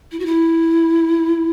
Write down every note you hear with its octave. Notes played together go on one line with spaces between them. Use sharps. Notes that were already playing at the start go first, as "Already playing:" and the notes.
E4
F#4
E4